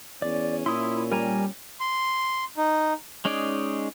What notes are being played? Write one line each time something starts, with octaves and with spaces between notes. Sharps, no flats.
E2 C#4 D5
A#2 E4 C6 D#6
G3 A#4 G#5 A#5
C6
D#4
G#3 C#4 D#4 G#4 D5